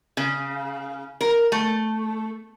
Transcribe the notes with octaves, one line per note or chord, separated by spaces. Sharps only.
C#3
A#4
A3